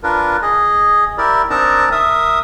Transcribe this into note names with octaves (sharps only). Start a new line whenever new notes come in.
D4 F4 A#4 B4
G#4 D#5
E4 G4 A#4 D5
C4 D4 D#4 A#4 A5 A#5
A#4 E5 D#6